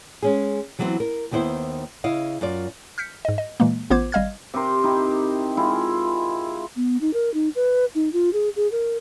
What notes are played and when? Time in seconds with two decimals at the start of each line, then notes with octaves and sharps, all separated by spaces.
0.22 G#3 C#4 G#4
0.79 E3 F#3 G3 B3 C4
1.00 A#4
1.31 D#2 D#3 B3 E4 C5
2.04 C#3 E4 D#5 F5
2.41 F#2 F4 D5
2.98 F6 G6 B6 C#7
3.25 G#2 D#5
3.38 D#5
3.60 A#2 E3 G#3 A#3
3.90 A1 B3 F4 C5 D6 G#6
4.12 G#1 G3 D#5 F5 F6 G#6
4.54 C3 G4 A#4 C6
4.84 D#4 E4 G4
5.57 G#3 E4 F4
6.76 B3
7.01 D#4
7.13 A#4
7.34 D#4
7.55 B4
7.95 D#4
8.13 F4
8.33 G#4
8.56 G#4
8.72 A#4